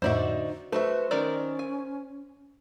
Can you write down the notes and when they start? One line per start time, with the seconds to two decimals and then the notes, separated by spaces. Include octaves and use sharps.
0.02 F2 A2 D3 D#4 F#4 C5 D5 E5
0.72 A3 F#4 A4 B4 C5 E5
1.11 D#3 C#4 A#4 D5
1.59 G#5